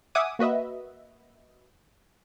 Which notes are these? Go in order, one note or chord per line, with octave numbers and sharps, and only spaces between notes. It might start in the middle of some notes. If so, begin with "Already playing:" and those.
E5 F#5 G#5 D6 D#6
A#3 F#4 B4 D#5 E5